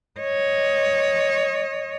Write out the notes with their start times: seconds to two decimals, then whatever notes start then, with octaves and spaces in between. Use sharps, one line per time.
0.20 C#5 D#5